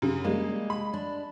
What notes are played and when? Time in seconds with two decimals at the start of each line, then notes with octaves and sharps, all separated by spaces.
0.02 F#2 C#3
0.24 G3 G#3 A#3
0.70 B5
0.94 D4